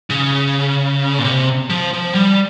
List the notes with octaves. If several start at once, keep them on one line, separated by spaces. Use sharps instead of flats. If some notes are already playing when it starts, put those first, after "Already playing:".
C#3
A#2
C3
F3
F3
G3